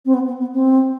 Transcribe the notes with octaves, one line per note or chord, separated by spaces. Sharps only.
C4
B3
B3
B3
C4